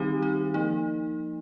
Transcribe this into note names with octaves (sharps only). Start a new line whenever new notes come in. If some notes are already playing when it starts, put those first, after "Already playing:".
Already playing: D#3 G3 C4 D#4 G4
D#4
F3 A#3 D#4